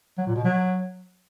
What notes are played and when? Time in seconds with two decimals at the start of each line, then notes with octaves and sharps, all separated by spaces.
0.18 F#3
0.27 A#2
0.36 B2
0.44 F#3